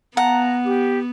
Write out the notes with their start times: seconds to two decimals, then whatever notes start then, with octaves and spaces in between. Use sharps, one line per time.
0.17 B3 F5 F#5 A5 A#5
0.66 G4